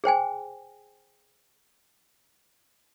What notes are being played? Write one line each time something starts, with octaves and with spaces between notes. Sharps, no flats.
G#4 C5 G5 G#5